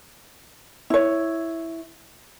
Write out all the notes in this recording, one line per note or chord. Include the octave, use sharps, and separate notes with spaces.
E4 C#5